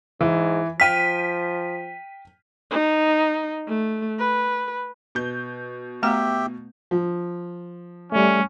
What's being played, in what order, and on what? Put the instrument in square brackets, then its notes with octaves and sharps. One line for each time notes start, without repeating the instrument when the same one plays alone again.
[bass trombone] G#2 [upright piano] E3
[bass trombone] F3 [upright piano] G5 F6 [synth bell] B6 D#7
[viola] D#4
A3
B4
[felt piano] B2 G6
[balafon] A3 B3 A#5 [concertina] G4 E5 G5
[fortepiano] F3
[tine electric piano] G3 A3 [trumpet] C#4